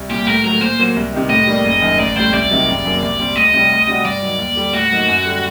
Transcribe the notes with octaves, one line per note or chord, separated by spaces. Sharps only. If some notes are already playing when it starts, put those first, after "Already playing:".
Already playing: C2
A#2 G3 G4
A2 A#4
F#3 A3 A#4
A#2 C5
F#3 A#3
C2
C3 D#3
A2 D#5
G3 A#3 D4
F#1
F#2 D#3
A1 D5
A2 G3 C5
C2 D5
C3 D#3 F#3
F#1
F#2 F#3 A#3
C2
A#2 G3 C4
D2 D#5
C3 G3
D2
C3 G3 D4 F#4
G2 D5
D#3 F#3
D#2
D3 G3
A2 F#4
F#3 A#3 D#4
F#2
D3 G3